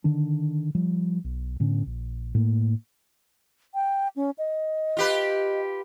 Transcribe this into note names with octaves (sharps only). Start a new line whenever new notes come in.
D3 D#3 D4
F3 G3
B1
A2 D3 B3 C#4
A#1
A2 A#3
G5
C#4
D#5
F4 G4 B4